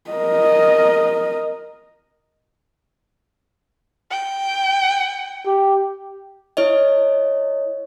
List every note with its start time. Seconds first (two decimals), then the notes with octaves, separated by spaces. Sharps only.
0.10 A#4 D#5
4.11 G5
5.46 G4
6.57 E4 C#5 D#5